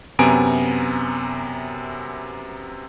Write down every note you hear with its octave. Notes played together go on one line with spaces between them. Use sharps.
F#2 C3 B3 G#5 A#5 D7